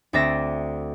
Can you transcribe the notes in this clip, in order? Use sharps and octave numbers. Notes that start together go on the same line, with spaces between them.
D2 C4 D5 E5 A#6